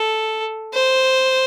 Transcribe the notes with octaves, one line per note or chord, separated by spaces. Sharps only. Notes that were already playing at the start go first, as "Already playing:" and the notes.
Already playing: A4
C5